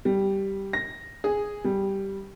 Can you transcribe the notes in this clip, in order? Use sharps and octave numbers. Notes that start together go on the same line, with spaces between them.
G3
A#6
G#4
G3